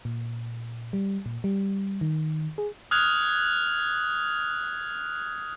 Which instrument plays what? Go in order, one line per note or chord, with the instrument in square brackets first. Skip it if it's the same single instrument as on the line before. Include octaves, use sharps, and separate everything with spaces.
[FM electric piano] A#2
G3
A#2
G3
D#3
G#4
[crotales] D#6 F6 F#6 G#6 F7